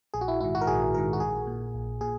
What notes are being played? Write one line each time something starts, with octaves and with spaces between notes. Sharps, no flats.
A#1 G#4
F#4
E4
G#2 D#3 E4
F#4
A#4
A#1 G#4
G#2 D#3 A#4
F#4
A#1 G#4
A#2
A#1
A#2 G#4